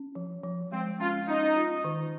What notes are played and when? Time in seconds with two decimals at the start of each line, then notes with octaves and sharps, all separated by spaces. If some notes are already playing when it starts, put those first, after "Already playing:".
Already playing: C#4
0.15 F3
0.44 F3
0.72 G#3 C4
0.99 C#4 F4
1.28 C#4 D#4
1.56 F4
1.84 D#3